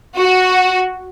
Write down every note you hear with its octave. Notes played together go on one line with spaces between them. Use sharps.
F#4